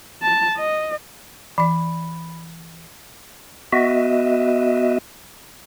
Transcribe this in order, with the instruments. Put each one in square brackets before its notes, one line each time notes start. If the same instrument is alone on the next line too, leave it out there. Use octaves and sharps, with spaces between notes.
[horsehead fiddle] A5
D#5
[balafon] E3 D5 [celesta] B5
[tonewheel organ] B3 F#4 D#5 E5